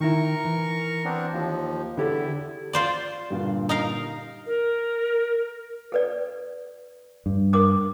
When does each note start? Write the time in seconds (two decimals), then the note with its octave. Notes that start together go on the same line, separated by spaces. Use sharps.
0.01 D#3 E4 A#4 C#6
0.45 E3
1.05 B3 C4 D4
1.32 D#2 F3
1.97 E2 D3 E4 G4 A4
2.73 F4 C5 D5
3.30 G2 A#2 D3
3.69 D#4 A#4 F5
4.46 A#4
5.92 A4 B4 D5
7.26 G2
7.53 A#4 D6 D#6